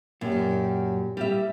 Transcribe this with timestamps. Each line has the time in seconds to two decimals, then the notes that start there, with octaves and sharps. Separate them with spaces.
0.21 F#2 A#2 G4
1.17 G3 G4 E5